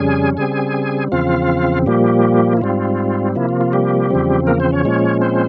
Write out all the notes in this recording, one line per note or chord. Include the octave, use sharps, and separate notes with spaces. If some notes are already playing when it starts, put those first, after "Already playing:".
Already playing: F2 C#3 G3 C#4 G#4 G#5
C#3 G3 C4 G#4 G#5
E2 C#3 F3 C4 F4 F5
A#2 F3 G3 A#3 G4
E4
G#2 G3 C4 F4
C3 F3 A#3 E4
F4
F4
G3 G4
E2 C#3 F3 C4
A#3 A#4
C4 C5
C#4 C#5
A#2 F3 G#3 C#4
C4 C5